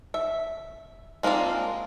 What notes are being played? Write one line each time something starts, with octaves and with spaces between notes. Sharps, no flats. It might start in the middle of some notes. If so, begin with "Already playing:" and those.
E5
G#3 A#3 C4 D4 F4